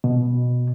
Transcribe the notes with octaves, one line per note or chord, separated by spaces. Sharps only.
B2